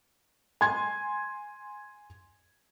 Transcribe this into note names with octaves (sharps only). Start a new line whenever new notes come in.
G#5 C6 G#6